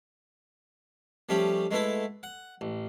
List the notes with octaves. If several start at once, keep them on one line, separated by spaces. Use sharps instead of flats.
F3 G3 A3 C#4 G4
G#3 A3 B3 E4 A4
F#5
A1